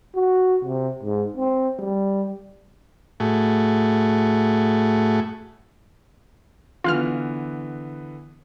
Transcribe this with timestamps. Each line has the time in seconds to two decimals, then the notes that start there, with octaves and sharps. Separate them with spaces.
0.15 F#4
0.65 C3
1.03 G#2
1.37 C4
1.79 G3
3.20 A2 A3 F#4 G#4
6.84 D3 E3 B3 F4 F5 F6